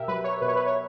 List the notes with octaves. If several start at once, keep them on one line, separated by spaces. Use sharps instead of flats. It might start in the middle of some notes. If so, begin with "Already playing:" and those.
Already playing: B2 G4 A#4 E5
F#3 B4
C#5
B2 B4
C#5
B4
C#5